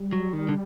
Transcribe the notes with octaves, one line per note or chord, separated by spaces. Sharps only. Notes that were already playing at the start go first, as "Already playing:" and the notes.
Already playing: G3
F#3
D#3
D3